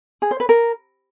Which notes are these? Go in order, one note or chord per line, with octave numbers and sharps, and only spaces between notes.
G#4
C5
B4
A#4